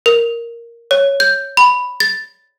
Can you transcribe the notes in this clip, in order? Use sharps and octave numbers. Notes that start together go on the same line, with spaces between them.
A#4
C#5
G6
B5
A6